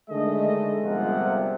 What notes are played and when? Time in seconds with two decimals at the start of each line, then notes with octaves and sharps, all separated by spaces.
0.10 D3 D#3 G#3 A3 D#5
0.83 G1 C3 F3 F4 A#4 F#5